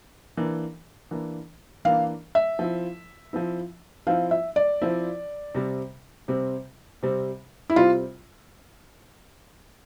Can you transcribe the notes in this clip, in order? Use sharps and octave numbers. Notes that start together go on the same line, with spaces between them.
E3 A#3 D4
E3 A#3 D4
E3 A#3 D4 F5
E5
F3 C4 E4
F3 C4 E4
F3 C4 E4 F5
E5
D5
F3 C4 E4
C3 G3 C4
C3 G3 C4
C3 G3 C4
E4
C3 G3 C4 F4